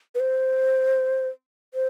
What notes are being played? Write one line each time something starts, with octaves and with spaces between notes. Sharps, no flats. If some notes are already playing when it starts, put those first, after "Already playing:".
B4
C5
C5